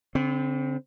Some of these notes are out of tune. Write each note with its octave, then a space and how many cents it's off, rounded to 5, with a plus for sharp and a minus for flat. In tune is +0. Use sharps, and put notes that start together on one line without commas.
D3 -40 C4 +0